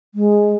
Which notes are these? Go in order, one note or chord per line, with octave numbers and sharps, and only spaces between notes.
G#3